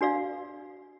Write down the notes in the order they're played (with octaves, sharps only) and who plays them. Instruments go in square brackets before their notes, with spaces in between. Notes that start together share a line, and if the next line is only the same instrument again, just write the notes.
[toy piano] D4 F#4 D5 F5